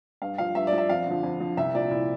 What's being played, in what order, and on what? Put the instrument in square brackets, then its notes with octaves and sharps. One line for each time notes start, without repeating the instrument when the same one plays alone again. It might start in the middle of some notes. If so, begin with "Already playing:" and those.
[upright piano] G2 F5
F3 F5
G2 E5
D5
F3
E5
F2 F5
D3 F3
F2
D3 F3
C2 E5
A#2 F3 D5
C2 E4